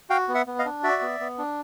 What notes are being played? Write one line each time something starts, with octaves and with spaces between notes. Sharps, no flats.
F#4 F5 G5
B3
E5 F#5
B3
D#5 F5
D4
F#4 D5 E5
B3
B3
D4